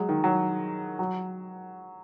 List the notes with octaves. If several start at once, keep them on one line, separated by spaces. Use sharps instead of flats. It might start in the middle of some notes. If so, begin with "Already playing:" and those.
Already playing: F#3 G#3
D#3
F#3
F#3